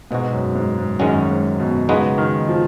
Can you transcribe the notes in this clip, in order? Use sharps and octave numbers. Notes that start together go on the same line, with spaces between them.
G#2 B2 G#3 D#4 F#4
F#2
G#2
G#2
F#2 D#3 G#3 C#4 F#4
G#2
B2
C#3 G#3 B3 D#4 F#4 B4
D#3
F3